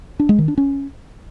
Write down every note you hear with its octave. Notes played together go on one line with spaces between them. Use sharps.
D4
G#3
D#3
D4
C#4